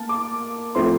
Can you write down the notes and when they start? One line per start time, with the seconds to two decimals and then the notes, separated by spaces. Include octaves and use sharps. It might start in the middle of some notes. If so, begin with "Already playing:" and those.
Already playing: A#3 A5
0.09 D6
0.75 A2 F3 A3 C4 C6